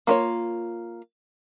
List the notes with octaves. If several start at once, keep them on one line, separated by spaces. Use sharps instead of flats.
A#3 F4 C#5